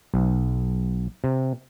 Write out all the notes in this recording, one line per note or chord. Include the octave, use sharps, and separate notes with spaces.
B1
C3